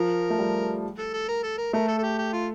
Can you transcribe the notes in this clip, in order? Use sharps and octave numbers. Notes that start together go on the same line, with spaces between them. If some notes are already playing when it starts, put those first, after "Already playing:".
Already playing: F3 A#4
A3
G3
A4
A4
A#4
A4
A#4
A3 A#4
A4
A4
G4
G4
F4